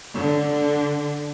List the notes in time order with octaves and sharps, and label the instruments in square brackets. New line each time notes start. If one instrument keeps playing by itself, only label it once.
[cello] D3